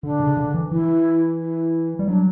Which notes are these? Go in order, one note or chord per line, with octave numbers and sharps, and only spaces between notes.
D3 D4
C#3
D3
E3
E3 E4
E4
G3
F#3 D4